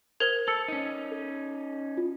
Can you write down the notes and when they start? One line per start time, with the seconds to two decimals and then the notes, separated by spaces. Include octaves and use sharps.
0.20 A#4 C5 G#6
0.48 A4 E6 C#7
0.68 C#4 D#4
1.11 A4
1.97 F4